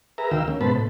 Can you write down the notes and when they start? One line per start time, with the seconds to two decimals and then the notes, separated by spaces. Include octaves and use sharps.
0.18 G#4 A#4 B4 E5 A#5
0.31 D#2 D#3 F#4 F5 G5 E6
0.48 A#3 C#4
0.61 G#2 B2 B3 C5 A5 B5
0.75 A2